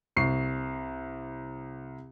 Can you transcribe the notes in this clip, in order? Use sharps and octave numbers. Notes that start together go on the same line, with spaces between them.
C2 C#6 C7